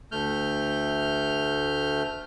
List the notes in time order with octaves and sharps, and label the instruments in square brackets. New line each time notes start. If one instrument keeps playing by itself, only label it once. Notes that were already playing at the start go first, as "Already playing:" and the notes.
[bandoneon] D2 A3 F6 G6